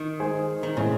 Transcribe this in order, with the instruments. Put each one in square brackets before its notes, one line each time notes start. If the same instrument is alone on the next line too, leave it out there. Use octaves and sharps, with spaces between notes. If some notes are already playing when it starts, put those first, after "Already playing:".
Already playing: [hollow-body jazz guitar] D#3
[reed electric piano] G#3 D#4 G#4 C5
[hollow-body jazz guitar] D#3
[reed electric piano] A2 E3 G#3 C4 [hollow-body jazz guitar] C#3